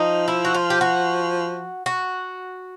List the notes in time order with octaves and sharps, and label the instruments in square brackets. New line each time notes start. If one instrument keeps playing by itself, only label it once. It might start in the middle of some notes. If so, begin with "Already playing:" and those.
Already playing: [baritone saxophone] F3 [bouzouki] D#4
[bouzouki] E4
F#4
F4
G4
F#4
F#4